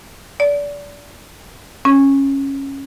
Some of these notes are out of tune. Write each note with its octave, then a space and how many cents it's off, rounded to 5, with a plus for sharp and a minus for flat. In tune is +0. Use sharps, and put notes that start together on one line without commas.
D5 -25
C#4 -15